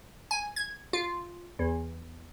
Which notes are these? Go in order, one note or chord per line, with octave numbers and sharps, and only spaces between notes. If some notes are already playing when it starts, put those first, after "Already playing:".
G#5
G#6
F4
E2